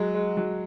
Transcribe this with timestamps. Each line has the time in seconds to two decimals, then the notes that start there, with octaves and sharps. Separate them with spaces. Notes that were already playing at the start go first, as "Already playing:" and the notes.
Already playing: F#3 G#3
0.15 G#3
0.37 F#3